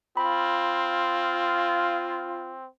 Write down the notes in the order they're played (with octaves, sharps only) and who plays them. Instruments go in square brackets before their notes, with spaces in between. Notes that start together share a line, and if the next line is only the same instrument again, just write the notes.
[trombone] C4 [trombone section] F4 [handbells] B5